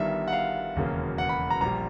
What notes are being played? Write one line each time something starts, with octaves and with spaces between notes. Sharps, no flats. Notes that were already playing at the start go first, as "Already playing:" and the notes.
Already playing: G1 G2 D#3 G3 B3 E5
F#5
F5
E1 D#2 C#3 F#3 A#3
F#5
B5
A#5
A#1 A#2 G3 A#5